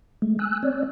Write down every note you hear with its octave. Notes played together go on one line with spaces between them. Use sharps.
G#3 A3
G#5 E6 F#6
C4 C#5 D5